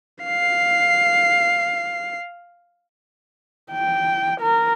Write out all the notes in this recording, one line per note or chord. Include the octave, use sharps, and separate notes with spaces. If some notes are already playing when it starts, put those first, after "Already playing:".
F5 C7
G5
A#4